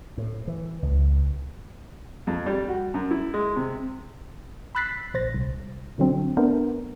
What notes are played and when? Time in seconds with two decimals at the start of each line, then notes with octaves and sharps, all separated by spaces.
0.18 A2
0.48 E3
0.82 C#2
2.27 F2
2.46 G3
2.69 F#4
2.94 F#2
3.11 E4
3.34 G#3
3.56 C3
4.75 B5 E6 F#6 A6 B6 C7
5.14 A#1 C5 A6 A#6
5.34 C2
5.98 B2 D3 F#3 C4 D4
6.37 A3 B3 D4 A#4 C5